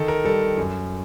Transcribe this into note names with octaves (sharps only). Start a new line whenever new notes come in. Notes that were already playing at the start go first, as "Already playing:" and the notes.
Already playing: D#3 A4
A#4
G3 A4
F#2